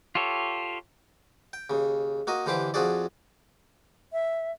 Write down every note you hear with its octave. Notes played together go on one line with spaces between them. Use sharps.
F4 G4 A4 C#5
G5
D#2 C#3
A#3 F#4 D#5
D#2 D3 E3 G4 C5 D6
F2 F3 F#4 G#4 D5
E5